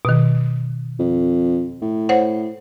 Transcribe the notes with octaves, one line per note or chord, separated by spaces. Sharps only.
B2 D#3
F2
A2
C5 C#5 F#5